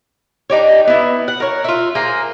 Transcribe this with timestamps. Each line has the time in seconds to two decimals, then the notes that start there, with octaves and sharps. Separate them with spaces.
0.50 D4 D#4 G4 C#5
0.88 B3 E4
1.28 F#5
1.40 A#4 C#5
1.64 F4 E5
1.95 A#3 G#4 C5